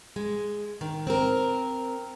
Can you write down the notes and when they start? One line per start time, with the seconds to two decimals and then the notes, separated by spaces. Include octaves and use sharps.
0.16 G#3
0.81 D#3
1.07 C4 A#4